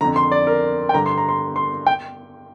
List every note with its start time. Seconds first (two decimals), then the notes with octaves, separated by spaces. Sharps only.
0.01 D3 A#5
0.04 F2
0.16 C6
0.31 D5
0.47 A#4
0.89 G5
0.94 G2 D3 A#5
1.06 C6
1.18 A#5
1.28 C6
1.56 C6
1.87 G5